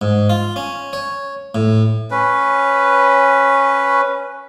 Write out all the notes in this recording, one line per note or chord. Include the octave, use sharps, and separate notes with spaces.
G#2
F4
C#4
C#5
A2
C#4 B4